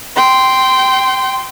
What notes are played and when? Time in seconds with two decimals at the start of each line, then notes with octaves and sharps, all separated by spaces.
0.16 G5 C6